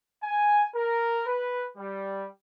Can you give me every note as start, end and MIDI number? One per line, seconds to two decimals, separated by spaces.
0.23 0.63 80
0.75 1.23 70
1.27 1.66 71
1.77 2.27 55